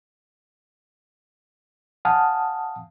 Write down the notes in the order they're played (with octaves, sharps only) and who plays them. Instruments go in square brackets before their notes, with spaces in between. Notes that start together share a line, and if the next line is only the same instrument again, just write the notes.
[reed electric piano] F5 F#5 G#5 A5 D#6 F6